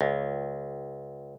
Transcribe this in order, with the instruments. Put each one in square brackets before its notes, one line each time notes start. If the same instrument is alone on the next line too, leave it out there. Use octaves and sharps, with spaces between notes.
[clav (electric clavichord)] C#2